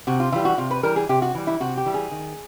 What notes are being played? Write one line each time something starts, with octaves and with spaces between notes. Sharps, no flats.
C3 F#4
F4
E3 G3 F4
F#4
C3 F4
B4
E3 G3 A#4
G#4
C3 G4
F#4
E3 G3
E4
C3 F#4
G4
E3 G3
G#4
D#3